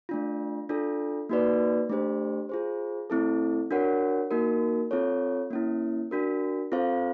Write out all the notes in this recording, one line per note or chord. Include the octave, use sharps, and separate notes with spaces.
A3 D4 F4
D4 F4 A4
A#3 D#4 F#4 B4 D5
A3 D4 G4 C5
F4 G#4 C5
A3 C4 E4 A4
D4 F#4 A#4 C#5 F#5
A#3 D#4 F#4 A#4
C4 F4 A4 C#5
A#3 C#4 E4
D4 F#4 A#4
C4 F4 A4 C5 F5